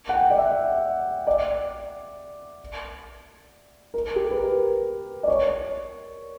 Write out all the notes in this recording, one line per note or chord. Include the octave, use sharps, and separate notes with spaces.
F#5
G5
D5
E5
D5
A#4
G4
B4
A#4
D5
C#5